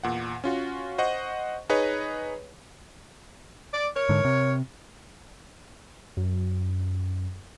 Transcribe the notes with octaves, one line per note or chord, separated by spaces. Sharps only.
E2 A#2 F#5
C#4 F4 F#4
C5 D#5 F#5 C#6
D#4 G#4 B4 C#5 D#5
D5
A#4 C#5
G#2 D3
C3
F#2